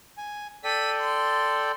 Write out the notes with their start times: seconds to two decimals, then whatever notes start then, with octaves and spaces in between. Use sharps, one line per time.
0.18 G#5
0.64 A4 D5 G5 B6 D#7
1.00 C6